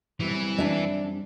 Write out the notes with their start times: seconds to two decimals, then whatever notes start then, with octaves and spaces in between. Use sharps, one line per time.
0.20 F#2 E3 G3 C4
0.58 D4 E5